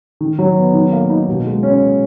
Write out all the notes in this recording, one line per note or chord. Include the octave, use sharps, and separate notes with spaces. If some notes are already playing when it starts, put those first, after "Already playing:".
D#3
F#3
B3
D#3
A#3
D#4
B2
G#3
C#4